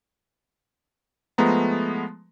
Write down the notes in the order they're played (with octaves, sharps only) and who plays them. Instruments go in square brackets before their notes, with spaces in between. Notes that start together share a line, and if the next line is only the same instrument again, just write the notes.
[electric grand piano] F3 G#3 A3 B3 A#5